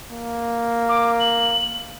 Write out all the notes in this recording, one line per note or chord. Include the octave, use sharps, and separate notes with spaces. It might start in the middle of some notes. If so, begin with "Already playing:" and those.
A#3
D6
F#7